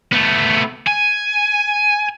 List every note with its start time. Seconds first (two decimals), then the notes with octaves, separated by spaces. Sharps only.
0.13 A3 B3
0.87 G#5